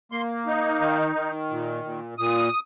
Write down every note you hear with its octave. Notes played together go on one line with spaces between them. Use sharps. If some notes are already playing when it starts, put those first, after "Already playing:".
A#3 C6
D#4
D#3
D#3
A#2
A#2
A#2 D#6